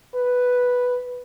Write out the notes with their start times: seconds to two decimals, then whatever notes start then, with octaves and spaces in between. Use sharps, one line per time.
0.15 B4